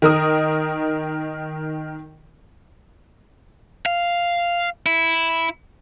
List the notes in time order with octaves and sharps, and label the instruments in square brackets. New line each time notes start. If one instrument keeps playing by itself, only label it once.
[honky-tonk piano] D#3 A#4 D#6
[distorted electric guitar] F5
E4